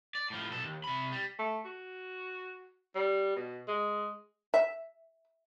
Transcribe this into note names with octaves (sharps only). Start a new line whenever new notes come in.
D5
A2 F3
B1 A4
D#2
C3 B5
G3
A3
F#4
G3
B2
G#3
E5